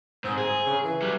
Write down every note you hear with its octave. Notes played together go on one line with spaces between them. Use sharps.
G#2 C4
G#4
C#3
E3
F#3 G3